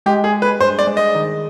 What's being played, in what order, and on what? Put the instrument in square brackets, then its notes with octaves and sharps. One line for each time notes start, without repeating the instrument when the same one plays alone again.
[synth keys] G#3 [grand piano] G4
[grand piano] G#4
[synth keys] G#3
[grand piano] B4
[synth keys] G2 [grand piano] C5
[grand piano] D5
[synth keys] G#3
[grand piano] D#5
[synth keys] D#3